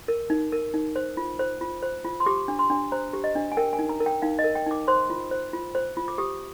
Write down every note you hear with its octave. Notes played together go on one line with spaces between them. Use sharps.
A#4
D#4
A#4
D#4
C5
F4
C5
F4
C5
F4
C6
G4 D6
D4
C6
D4
C5 A#5
G4
D#5
D4
G#5
A#4 G5
G#5
D#4
A#5
A#4
G5
D#4 F5
D#5
A#4
G5
D#4 D6
C5 C6
F4
C5
F4
C5
F4
D6
G4 D#6